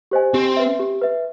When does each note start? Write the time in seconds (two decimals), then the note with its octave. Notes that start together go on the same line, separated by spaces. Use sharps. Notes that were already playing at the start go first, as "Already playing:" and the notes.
0.11 G4 C5 D#5 G#5
0.34 C4 G4
0.57 B4 E5
0.79 G4
1.02 B4 E5